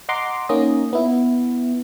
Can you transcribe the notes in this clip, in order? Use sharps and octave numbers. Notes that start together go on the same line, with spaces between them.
D#5 F#5 A#5 C6 D6
A#3 C#4 D#4 D#5
B3 E4